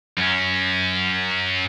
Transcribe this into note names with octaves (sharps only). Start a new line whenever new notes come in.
F#2 C#4